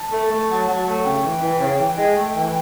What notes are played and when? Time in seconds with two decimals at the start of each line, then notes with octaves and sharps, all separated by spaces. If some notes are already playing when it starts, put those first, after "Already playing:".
Already playing: A5
0.12 A3
0.30 A3
0.49 F#3
0.67 F#3
0.86 A3
1.04 C#3 G5
1.22 E3
1.41 E3
1.59 C#3
1.79 E3
1.97 G#3
2.16 A3
2.35 E3